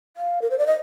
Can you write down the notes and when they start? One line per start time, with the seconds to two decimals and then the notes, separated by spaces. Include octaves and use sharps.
0.17 F5
0.42 A#4
0.50 C5
0.58 D5
0.67 D#5